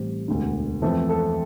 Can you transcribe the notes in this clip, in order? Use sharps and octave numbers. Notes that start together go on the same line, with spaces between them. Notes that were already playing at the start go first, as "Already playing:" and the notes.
Already playing: A1 A2 E3 G3 C4
E1 D2 D3
F2 E3 A3 C4 A4
A4